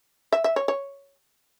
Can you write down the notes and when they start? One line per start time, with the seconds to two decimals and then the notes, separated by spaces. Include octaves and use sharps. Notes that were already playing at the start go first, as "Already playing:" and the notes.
0.32 E5
0.44 E5
0.56 C#5
0.68 C#5